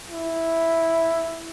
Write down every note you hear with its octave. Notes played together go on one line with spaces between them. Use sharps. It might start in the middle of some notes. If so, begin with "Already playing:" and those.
E4